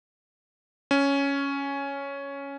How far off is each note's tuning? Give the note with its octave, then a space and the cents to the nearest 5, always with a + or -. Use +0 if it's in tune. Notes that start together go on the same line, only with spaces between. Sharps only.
C#4 +5